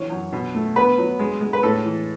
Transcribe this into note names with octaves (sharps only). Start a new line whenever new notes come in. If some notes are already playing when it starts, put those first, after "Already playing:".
Already playing: E3 F#3 C#5
F#2
B2
A3
B3 B4
F#3
G#3
G#3
B4
A2 A4
E3